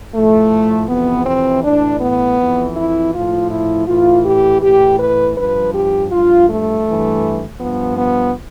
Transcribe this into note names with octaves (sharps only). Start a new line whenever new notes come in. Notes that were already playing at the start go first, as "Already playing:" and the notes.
A2 F3 A3
F2 C3 E3 B3
C4
A2 E3 D4
B3
F2 E3
E4
A2 F3 F4
E4
A2 E3 F4
G4
A2 E3 G4
B4
G2 F3 B4
G4
G2 F3 F4
A3
G2 E3
G2 F3 B3
B3